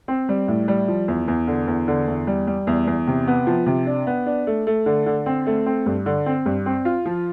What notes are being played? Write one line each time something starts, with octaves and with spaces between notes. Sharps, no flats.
C4
G3
A2
G3
F3
E2
E2
D3
E2
D3
E2
G3
G3
E2
E2
C3
B3
F3
C3
D4
B3
D4
A3
A3
D3
D3
C4
A3
C4
G2
D3
C4
G2
C4
F4
F3